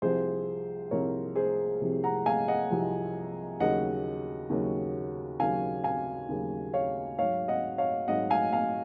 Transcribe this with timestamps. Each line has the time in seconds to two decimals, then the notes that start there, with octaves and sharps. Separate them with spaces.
0.02 C2 C3 F3 G#4 C5
0.91 C2 C3 F3 A#4 C#5
1.36 G#4 C5
1.81 C2 C3 F3
2.04 F#5 A#5
2.26 F5 G#5
2.48 D#5 F#5
2.70 C2 C3 F3
3.60 D#2 C#3 F#3 D#5 F#5
4.50 D#2 C#3 F#3
5.40 D#2 C#3 F#3 F5 G#5
5.84 F5 G#5
6.29 D#2 C#3 F#3
6.74 C#5 F5
7.18 G#2 F#3 C#5 F5
7.48 D#5 F#5
7.78 C#5 F5
8.08 G#2 F#3 D#5 F#5
8.30 F5 G#5
8.52 F5 G#5